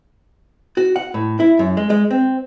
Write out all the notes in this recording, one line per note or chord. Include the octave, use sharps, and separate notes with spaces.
F#4
F#5
A2
E4
F#2
G#3
G#3
C4